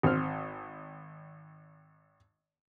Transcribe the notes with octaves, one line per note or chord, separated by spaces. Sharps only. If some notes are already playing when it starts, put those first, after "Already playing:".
G#1 C4 F6